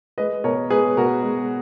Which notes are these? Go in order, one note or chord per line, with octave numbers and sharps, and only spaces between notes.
G#3 B4 D#5
B2 A#4 C#5
G#3 G#4 B4
B2 F#4 A#4
G#3